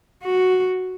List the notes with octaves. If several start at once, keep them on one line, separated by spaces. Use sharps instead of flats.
F#4